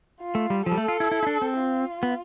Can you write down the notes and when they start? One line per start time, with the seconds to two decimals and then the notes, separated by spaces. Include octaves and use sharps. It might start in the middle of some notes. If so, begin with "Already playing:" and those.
0.21 F4
0.35 A3
0.50 G3
0.65 F3 A4
0.72 G3
0.77 A3
0.88 F4
1.00 E4
1.11 E4
1.23 E4
1.27 D4
1.42 C4
1.58 F4
2.03 B3